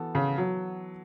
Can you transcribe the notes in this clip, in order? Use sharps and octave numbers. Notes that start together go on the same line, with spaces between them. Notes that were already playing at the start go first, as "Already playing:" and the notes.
Already playing: E3 B3 F#4 A4
C#3
F#3